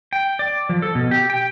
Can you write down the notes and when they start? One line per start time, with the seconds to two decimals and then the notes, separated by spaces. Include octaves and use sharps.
0.13 G5
0.39 D5
0.69 F3
0.82 A4
0.95 B2
1.11 G4
1.30 G5